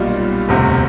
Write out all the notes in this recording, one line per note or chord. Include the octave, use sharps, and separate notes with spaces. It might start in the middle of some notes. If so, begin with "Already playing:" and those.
Already playing: B1 A#2 G3 F4
E1 D2 C3